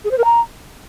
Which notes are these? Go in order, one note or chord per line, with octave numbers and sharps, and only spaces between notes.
G#4
C5
A#4
A#5